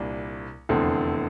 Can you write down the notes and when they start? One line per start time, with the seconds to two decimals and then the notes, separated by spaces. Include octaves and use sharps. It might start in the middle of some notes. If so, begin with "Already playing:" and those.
Already playing: C2 A#2 G3 A#3 D4
0.69 F1 E2 D3 A3 C4